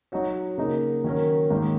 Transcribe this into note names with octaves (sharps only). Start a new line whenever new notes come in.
F#3 D#4 F#4 C#5
C#3 A#3 D#4 F#4 A#4
D#3 F#3 C#4 A#4
G#2 D#3 A#3 D#4